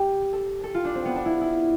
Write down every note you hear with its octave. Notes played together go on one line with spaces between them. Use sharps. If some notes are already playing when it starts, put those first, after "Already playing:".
Already playing: G4
A4
A4
F4
D4
C4
B3
D4
E4
E4